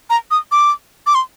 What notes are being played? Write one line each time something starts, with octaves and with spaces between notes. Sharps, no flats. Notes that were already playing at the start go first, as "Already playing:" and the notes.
A#5
D#6
D6
D6
C6